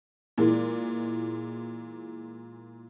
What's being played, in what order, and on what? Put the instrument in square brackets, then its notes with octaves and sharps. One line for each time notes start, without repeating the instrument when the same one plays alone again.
[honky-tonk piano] A#2 E3 G#3